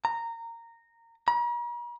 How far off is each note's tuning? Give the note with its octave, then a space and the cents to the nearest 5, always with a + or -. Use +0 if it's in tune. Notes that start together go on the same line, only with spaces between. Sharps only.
A#5 -15
A#5 +45